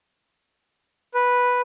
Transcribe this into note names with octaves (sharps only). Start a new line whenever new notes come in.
B4